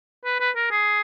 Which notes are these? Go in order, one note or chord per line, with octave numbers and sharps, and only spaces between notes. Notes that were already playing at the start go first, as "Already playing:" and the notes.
B4
B4
A#4
G#4